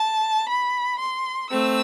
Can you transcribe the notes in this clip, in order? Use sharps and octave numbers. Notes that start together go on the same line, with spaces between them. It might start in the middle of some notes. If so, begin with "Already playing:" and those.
Already playing: A5
B5
C6
A3 C4 E6